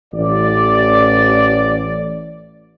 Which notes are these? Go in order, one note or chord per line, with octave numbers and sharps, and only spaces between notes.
A1 D5